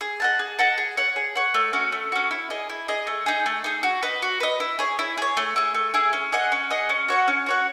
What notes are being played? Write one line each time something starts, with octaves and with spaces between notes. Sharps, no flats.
G#4
D#5 F#5 A5
G#4
D#5 F#5 A5
G#4
C#5 F#5
G#4
C#5 F#5
A3
C#4 F#4
A3
C#4 F#4
E4
G#4 D#5
E4
G#4 D#5
A3
D#4 G#4
A3
D#4 G#4
F#4
B4 D#5
F#4
B4 D#5
E4
G#4 C#5
E4
G#4 C#5
A3
E4 G#4
A3
E4 G#4
C#4
G#4 D#5 F#5
C#4
G#4 D#5 F#5
C#4
F#4 C#5 F#5
C#4
F#4 C#5 F#5